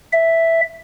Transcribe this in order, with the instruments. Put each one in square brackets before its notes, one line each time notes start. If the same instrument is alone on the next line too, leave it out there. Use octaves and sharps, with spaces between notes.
[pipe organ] E5